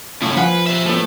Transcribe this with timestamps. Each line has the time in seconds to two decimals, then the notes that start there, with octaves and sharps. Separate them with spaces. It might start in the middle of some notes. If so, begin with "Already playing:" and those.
0.22 F#2 A2 C#3 C#5
0.37 F3 B4 F5 F#5 G#5
0.67 C5 E5
0.86 A2 A3 B3 E6